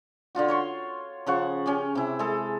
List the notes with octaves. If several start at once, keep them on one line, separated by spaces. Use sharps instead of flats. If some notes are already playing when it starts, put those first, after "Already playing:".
D3 D4 F4 F#4
C#5 C6 C#6
C#3 F3 F#5 C#6
C#4 G4 G#5
C3 E4
G#3 A4